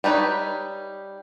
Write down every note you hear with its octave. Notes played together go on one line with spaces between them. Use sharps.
G3 B3 D#4 B4 C#5